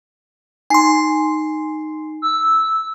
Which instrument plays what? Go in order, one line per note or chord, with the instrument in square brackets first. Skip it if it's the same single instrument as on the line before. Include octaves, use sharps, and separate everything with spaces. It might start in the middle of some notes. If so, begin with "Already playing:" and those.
[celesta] D#4 C7 [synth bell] G#5 C6
[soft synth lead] E6